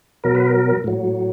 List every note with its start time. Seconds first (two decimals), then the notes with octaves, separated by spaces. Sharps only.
0.24 B2 F#3 A#4
0.35 B4
0.46 A#4
0.84 A2 F#3